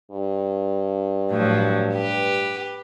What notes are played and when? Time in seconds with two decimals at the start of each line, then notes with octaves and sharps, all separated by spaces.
0.12 G2
1.31 A2 F3 F#3
1.96 G4 B4